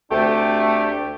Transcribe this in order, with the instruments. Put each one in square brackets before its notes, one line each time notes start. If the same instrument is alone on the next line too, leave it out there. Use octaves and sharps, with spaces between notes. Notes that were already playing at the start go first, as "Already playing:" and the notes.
[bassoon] D2 [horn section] C3 D4 G4 [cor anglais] A3